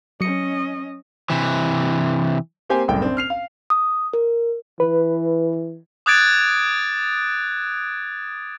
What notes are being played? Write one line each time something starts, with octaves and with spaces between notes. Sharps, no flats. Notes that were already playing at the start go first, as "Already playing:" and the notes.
F#3 C#4 D#5 C#7
C3 E3
A#3 C4 G4 C5 G#5
F#1 C2 A2 G5
C4 D4
F6 C7 F7
F5
D#6
A#4
E3 B4
D6 D#6 F#6 G#6 A6 D7